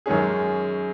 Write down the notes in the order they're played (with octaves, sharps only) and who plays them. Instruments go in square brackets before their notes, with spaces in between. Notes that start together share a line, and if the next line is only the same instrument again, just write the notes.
[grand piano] F#2 D#3 G#3 C#4 G#4